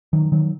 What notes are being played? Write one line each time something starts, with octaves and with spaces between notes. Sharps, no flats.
D#3 F#3
D#3 F#3